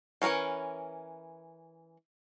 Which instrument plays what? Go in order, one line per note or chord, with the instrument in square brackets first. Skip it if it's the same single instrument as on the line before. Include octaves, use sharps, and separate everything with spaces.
[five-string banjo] E3 C#4 A#4 B4 C#5